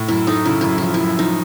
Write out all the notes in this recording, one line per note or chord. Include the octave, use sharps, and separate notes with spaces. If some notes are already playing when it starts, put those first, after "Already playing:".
Already playing: A2
F#2 E4
A3 D#4
C#3 E4
F#2 E4
F3 E4
E4
F#2
F3 D#4